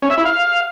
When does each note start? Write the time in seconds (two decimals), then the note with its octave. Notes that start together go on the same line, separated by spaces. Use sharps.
0.02 C#4
0.10 E5
0.18 E4
0.25 F5